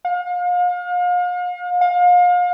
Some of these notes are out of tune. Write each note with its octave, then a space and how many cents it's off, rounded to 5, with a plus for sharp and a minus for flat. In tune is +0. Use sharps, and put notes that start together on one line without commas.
F5 +40
F5 +35